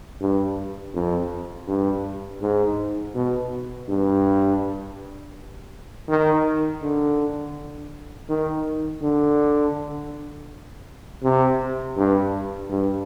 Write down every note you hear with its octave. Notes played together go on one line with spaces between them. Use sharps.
G2
F2
G2
G#2
B2
G2
D#3
D3
D#3
D3
C3
G2
G2